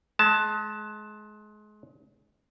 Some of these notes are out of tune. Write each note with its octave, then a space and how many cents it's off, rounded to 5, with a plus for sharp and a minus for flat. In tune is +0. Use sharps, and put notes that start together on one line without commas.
G#3 +30 A5 +0